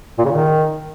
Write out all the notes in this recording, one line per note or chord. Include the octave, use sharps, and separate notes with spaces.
A#2
C#3
D#3